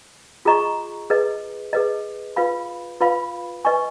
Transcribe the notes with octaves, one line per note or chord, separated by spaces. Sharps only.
F4 G#4 D#5 A#5 C#6
G#4 B4 D#5
G#4 B4 D#5
F4 B4 F5 B5
F4 B4 F5 B5
B4 D#5 G#5 C#6